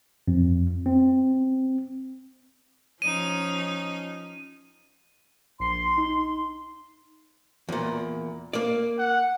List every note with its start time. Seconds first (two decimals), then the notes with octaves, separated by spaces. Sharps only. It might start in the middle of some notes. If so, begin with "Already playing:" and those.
0.28 F2
0.86 C4
3.02 F3 C#4 D#4 D#7
5.60 A#1 C6 C7
5.97 D#4
7.69 E2 A#2
8.53 A#3 D5
8.99 F#5